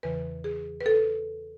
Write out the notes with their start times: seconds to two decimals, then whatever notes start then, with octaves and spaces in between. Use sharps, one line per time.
0.03 E2 C#3 E3 B4
0.44 G#4
0.81 B4
0.86 A4